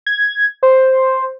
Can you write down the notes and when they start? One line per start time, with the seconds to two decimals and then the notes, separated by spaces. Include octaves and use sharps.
0.06 G#6
0.63 C5